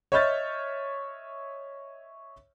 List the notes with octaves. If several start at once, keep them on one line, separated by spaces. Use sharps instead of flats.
C#5 D#5 E5 F6 G6 A6